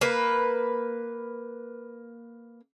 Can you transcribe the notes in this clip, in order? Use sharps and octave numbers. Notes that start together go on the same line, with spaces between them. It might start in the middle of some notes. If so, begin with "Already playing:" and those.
A#3 B4